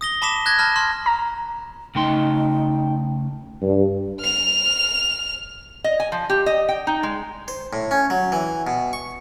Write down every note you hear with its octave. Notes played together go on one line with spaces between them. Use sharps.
D#6 A#6 G7
A5 B5 D6 B6 E7
F#6 G#6 A#6
A5 B5 F6
C6 F6
A#5
C#3 A3 D#4 G5 C6
G2
F6 F7
D#5
G#5
F3
G4
D#5
G5
D#4
G#3
C5
A2
C#4
F#3
E3
B2
C#6